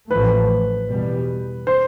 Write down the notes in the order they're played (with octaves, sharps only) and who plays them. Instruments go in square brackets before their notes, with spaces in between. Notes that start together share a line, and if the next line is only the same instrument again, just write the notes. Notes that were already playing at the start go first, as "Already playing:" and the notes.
[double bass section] A1 A2 F3 A3 [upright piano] B4
[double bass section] E2 B2 G3
[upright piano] C5